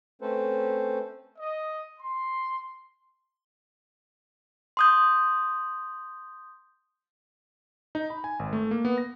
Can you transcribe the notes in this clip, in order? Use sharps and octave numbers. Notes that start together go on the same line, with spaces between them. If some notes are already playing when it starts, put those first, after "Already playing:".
A3 C4 C#4 A4 B4 C5
D#5
C6
C6 D#6 G6
D#4
B5
G#5
G#1
A3
A#3
B3
A#6